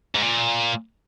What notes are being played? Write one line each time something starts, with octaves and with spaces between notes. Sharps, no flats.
G#2
A#2